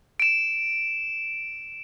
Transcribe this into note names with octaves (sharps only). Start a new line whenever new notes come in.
D7 E7